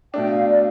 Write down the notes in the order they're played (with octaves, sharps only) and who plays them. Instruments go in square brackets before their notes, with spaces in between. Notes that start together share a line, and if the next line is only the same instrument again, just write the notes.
[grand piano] B2 A3 D4 [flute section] G5
[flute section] F5
D5